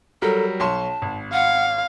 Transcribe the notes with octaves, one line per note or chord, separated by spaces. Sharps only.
F#3 G3 A4 A#4
B1 C#5 A5 C6
G#1
F5 F#5